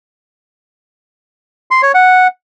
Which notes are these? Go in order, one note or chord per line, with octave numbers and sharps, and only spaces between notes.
C6
C#5
F#5